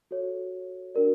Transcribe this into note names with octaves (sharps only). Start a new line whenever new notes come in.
F#4 A4 C#5
D4 F#4 A#4 D5